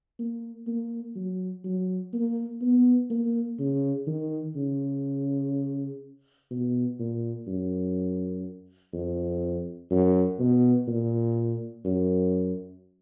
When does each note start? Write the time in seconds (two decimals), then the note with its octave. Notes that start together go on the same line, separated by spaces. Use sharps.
0.19 A#3
0.67 A#3
1.16 F#3
1.64 F#3
2.13 A#3
2.62 B3
3.10 A#3
3.59 C#3
4.07 D#3
4.56 C#3
6.51 B2
6.99 A#2
7.47 F#2
8.93 F2
9.91 F#2
10.39 B2
10.88 A#2
11.85 F#2